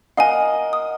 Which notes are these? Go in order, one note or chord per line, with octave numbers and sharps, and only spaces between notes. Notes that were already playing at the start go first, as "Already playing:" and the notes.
A#4 D#5 F5 F#5 G#5
D#6